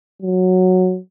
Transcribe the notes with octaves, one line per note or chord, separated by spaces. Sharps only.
F#3